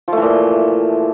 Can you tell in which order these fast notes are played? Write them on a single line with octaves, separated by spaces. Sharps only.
F3 A3 E3 A#2